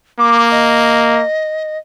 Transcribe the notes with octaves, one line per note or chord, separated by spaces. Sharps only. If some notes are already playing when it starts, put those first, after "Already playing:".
A#3 D6
D#5